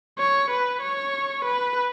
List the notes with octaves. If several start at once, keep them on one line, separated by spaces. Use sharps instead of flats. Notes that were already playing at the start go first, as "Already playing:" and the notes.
C#5
B4
C#5
B4